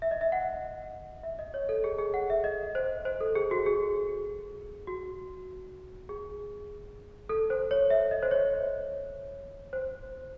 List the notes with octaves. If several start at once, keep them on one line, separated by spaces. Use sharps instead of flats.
E5
D#5
E5
F#5
E5
D#5
C#5
A4
G#4
G#4
F#5
E5
D#5
C5
C5
A4
G#4
F#4
G#4
F#4
G#4
A4
C5
C#5
E5
D#5
C5
C#5
C5